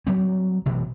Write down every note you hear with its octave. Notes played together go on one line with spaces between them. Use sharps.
F#3 G3 C4
A1 B2 E3